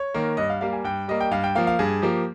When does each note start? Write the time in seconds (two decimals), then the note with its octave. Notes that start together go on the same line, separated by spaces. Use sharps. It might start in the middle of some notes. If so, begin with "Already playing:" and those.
Already playing: C#5
0.14 D#3 A#3
0.37 G2 D#5
0.50 F5
0.61 G3 A#3 F5
0.73 G#5
0.84 G2 G5
1.08 G3 A#3 D#5
1.20 G5
1.31 G2 F5
1.44 G5
1.55 F3 A#3 F5
1.67 F5
1.79 G2 G#4
2.02 F3 A#3 G4